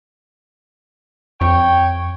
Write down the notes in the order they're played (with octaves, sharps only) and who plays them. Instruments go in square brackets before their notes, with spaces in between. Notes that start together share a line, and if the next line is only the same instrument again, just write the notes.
[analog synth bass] F2 [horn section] C#5 G5